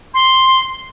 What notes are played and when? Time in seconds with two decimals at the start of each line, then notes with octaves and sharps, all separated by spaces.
0.14 C6